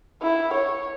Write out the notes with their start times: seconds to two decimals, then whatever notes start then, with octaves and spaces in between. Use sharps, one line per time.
0.22 E4
0.54 C#5